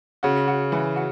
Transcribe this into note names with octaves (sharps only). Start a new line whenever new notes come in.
C#3 F#4
F#4
E3
F#4